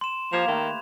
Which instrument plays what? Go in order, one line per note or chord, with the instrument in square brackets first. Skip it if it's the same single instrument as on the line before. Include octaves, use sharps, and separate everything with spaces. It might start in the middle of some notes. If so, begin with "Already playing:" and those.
[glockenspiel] C6 E7
[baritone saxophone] F3 [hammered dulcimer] A#3 G4 [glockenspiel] G#6 F7
[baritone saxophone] D#3 [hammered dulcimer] A3 B4